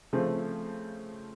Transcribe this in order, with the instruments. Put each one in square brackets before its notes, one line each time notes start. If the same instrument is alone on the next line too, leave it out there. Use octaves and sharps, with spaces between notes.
[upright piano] C#3 F3 A3 C4